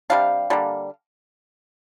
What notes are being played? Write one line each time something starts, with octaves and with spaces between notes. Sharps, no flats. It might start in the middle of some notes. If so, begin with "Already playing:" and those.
C3 G3 D4 F5
D3 G3 A#3